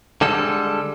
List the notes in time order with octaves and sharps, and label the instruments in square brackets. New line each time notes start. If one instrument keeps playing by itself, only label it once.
[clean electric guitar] D3 G3 G#3 A4